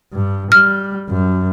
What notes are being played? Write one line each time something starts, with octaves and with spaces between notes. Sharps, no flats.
G2
G3 F6
F#2